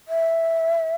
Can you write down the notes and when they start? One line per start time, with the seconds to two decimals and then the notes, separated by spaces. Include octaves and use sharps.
0.08 E5